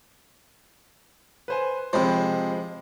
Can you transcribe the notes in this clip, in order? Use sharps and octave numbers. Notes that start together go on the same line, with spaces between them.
B4 C5 G#5
C3 F3 G#3 C5 B5